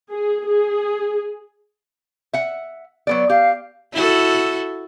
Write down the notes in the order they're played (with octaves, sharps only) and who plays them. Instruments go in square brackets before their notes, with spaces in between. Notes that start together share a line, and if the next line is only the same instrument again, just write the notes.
[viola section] G#4
G#4
[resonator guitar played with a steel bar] E5 F#5
F#3 B3 D5
[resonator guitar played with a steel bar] G4 [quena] F5
[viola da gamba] E4 F#4 A4